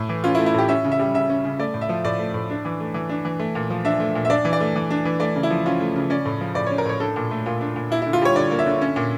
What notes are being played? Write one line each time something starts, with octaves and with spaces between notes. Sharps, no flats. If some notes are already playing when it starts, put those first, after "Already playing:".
Already playing: A2 A3
E3
C#4 F4
E4
A3
E4
A2 G4
C#4 E5
C#3
E5
G3
C#3 E5
C#4
C#3
A3 D5
A2
E5
F3
A2 D5
A3
A2
D4
E3
A3
E3
D4
E3
A3
A#2
F3
D4 E5
A3
A#2
E5
D4 D5
E3
D5
A3
E3
D4
E3
A3 D5
C#3
E4
F3
C#4 F4
A3
C#3
C#4 D5
A2
F3
A2 D5
C#5
C#4
A#4
A2 C#5
D4 A4
A#2
A3
A#2 F4
D4
A#2
A#3 E4
E4
D3
F4
G3 C#5
D3 D5
A#3
E5
D3
C#4
A#2